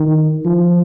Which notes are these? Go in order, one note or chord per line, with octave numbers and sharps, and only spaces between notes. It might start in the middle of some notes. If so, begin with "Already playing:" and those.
Already playing: D#3
F3